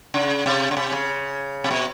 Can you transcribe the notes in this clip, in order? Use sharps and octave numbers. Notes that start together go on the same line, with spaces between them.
C#3
C3
C#3
C3
C#3
C3
B2